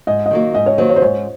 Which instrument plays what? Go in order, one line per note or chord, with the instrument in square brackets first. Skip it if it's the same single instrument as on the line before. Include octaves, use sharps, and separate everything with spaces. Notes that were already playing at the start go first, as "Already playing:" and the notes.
[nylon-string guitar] G#2 [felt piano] D#5
[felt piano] D#5
[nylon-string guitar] D#3 F#3 A#3
[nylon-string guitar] G#2 [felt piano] D#5
[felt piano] C#5
[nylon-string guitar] D#3 F#3 A#3 [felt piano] C5
[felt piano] C#5
C5
[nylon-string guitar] G#2 [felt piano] C#5